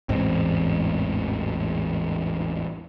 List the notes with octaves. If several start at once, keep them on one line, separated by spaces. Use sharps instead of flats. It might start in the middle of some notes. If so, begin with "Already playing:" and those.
A1 E2 G#2 C4